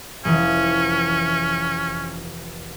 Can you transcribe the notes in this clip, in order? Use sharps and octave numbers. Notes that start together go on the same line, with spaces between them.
F1 E3 C#4